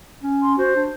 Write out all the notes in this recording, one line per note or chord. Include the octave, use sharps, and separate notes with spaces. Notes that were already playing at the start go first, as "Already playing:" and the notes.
C#4
C6
F#4 C5
D4